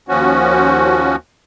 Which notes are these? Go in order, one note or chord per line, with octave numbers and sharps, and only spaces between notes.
D#2 F3 C#4 F#4